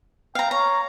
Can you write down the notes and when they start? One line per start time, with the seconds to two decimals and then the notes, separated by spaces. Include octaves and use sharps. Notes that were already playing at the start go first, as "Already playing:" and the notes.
0.35 F5 G5 A#5
0.51 C#5 A#5